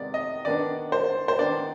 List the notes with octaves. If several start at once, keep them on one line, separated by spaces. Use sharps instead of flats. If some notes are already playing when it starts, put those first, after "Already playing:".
Already playing: C3 D#3 G#3 B3 D5
D#5
D#3 B3 D4 D5
C5
C5
D#3 B3 D4 D5